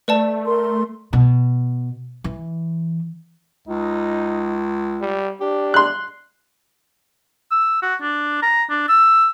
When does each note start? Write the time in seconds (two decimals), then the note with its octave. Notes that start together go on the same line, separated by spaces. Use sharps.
0.08 A3 B4 D5 A5
0.45 A#4 C6
1.13 B2
2.24 E3
3.68 C#2 D#4
5.01 G3
5.41 D4 G4
5.74 C6 F#6
7.51 E6
7.82 F#4
8.02 D4
8.43 A#5
8.70 D4
8.89 E6